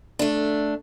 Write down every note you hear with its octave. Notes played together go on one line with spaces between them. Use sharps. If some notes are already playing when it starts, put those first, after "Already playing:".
A3 D4